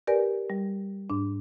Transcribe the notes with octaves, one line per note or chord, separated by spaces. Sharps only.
G4 A#4 B4 D5 G#5
G3
G#2 D4